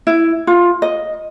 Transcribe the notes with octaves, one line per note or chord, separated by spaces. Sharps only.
E4
F4
D#5